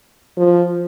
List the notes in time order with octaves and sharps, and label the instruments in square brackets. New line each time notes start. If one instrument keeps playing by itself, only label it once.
[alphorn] F3